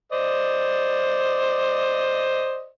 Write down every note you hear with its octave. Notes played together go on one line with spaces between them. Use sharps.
C5 D5 D#5